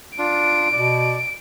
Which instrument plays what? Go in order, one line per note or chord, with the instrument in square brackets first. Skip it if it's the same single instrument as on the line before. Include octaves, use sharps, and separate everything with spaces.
[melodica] D4 F4 [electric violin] D7
[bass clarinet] B2 [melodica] D5